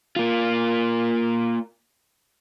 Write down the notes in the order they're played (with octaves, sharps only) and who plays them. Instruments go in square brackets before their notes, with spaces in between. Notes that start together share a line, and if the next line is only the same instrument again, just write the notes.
[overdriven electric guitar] A#3 F4